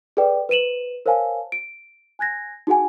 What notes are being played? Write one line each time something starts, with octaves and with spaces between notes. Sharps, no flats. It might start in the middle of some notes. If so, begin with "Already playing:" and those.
G#4 A4 B4 D5 G5
B4 C5 D#7 E7 F#7
A#4 C5 C#5 F5 G#5 A5
D7
G#5 F#6 G#6 A#6
D#4 F#4 G#4 F#5 G#5